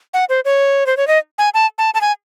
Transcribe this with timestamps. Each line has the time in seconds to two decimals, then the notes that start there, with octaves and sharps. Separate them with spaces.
0.14 F#5
0.29 C5
0.45 C#5
0.86 C5
0.97 C#5
1.07 D#5
1.38 G#5
1.54 A5
1.78 A5
1.94 A5
2.01 G#5